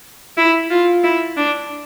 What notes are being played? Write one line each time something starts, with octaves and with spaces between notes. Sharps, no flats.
E4
F4
E4
D4